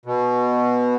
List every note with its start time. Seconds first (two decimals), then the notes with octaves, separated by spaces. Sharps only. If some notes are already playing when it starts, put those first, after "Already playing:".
0.06 B2